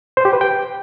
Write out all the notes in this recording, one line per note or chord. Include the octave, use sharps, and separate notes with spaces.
C5
G4
B4
G5